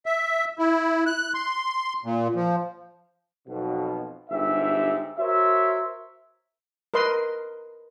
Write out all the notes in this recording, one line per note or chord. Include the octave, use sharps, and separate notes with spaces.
E5
E4
F#6
C6
A#2
F3
B1 F2 B2
G1 G#2 G4 E5
F#4 A#4 C5 C#5 E5
A#4 B4 D#5 C6